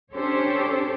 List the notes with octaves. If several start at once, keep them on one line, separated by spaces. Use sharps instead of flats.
C#4 D4 G4 A4 C5 C#5